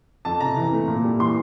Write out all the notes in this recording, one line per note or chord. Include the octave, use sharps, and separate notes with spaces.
F2 A5
C3 A#5
E3
A3
A#2
G3
E3 C6